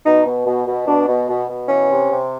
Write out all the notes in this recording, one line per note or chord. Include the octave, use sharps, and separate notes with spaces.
B2 D#4
B2
B2
B2
B2 D4
B2
B2
B2
E3 C#4
C3
C3